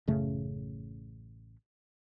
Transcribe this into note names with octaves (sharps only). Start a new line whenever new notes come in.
A1 F#2 C#3 A3